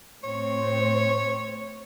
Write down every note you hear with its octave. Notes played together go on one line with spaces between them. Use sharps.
A2 C4 C5 C#5